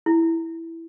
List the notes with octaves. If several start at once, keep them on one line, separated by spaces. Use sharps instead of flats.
E4